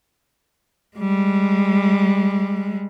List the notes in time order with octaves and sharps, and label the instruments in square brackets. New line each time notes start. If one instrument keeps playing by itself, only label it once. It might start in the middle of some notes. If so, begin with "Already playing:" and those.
[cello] G3 G#3